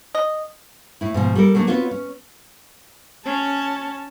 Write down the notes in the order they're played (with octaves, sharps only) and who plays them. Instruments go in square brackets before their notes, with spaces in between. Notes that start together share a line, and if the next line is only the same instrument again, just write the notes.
[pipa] D#5
[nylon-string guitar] A2 E4
G#2 B2 F3
G3 A4 A#4
F#3 A3 A#3 C#4 D4
B3 C4 F4 F#4 C#5
C#4
[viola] C#4 A5